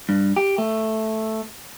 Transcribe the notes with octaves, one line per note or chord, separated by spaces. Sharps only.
G2
G4
A3